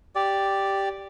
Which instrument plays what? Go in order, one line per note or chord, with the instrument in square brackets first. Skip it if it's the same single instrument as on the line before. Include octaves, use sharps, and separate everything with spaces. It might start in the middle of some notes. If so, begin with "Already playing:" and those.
[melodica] G4 D5